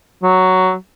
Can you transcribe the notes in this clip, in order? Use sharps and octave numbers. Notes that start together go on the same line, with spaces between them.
F#3